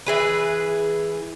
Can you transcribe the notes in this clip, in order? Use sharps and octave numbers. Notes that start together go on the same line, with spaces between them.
E3 G#4 B4